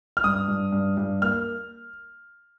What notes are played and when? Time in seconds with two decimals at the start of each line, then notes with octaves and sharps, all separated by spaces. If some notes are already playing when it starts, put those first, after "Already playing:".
0.17 F6
0.24 G2 D#6
0.48 G2
0.72 G2
0.97 G2
1.22 A#3 F6